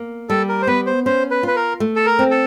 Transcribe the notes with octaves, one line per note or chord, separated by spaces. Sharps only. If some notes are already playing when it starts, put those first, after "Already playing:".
Already playing: A#3
G3 A4
A#4
C5
B3 B4
C5
C#4 C5
B4
F4 B4
A#4
A3
A4
A#4
C4
A4